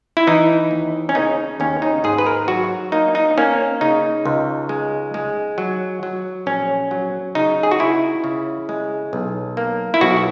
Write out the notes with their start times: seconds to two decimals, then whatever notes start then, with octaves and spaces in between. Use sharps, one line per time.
0.17 E4
0.27 E3 D#4
0.71 D#2
1.09 C#4
1.15 C#3 D#4
1.60 D#2 C#4
1.82 D#4
2.04 G#2 G#4
2.18 B4
2.26 A#4
2.48 F#3 F#4
2.92 A#3 D#4
3.15 D#4
3.38 A#3 C#4
3.81 C#3 D#4
4.25 C#2
4.69 G#3
5.14 G#3
5.58 F#3
6.03 F#3
6.46 A#1 C#4
6.91 F#3
7.35 C#3 D#4
7.63 G#4
7.71 F#4
7.79 C#2 E4
8.24 C#3
8.69 G#3
9.13 B1
9.57 A#3
9.94 E4
10.01 B1 F#4